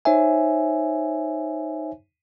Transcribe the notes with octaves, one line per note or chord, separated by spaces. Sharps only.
D#4 C5 C#5 E5 G#5